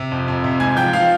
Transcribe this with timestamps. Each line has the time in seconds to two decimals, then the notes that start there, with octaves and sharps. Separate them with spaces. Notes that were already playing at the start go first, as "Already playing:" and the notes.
Already playing: C3
0.11 F2
0.28 F2
0.44 C3
0.60 G#2 G#5 G#6
0.76 F3 G5 G6
0.93 F3 F5 F6